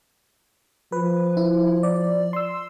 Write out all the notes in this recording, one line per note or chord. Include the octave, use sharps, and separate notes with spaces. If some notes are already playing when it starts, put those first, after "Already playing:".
F3 B4
E4
D5
C6 E6